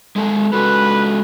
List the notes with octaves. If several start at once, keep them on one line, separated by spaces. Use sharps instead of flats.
G#3 A4
G#3 F#4 A4 B4